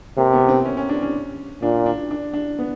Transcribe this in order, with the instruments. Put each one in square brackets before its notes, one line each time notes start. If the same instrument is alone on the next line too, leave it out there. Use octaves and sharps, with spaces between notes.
[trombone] C3 [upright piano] A#3
[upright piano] B3
C4
C#4
C#4
D4
C#4
[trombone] A#2 [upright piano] D4
[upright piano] D4
D4
D4
B3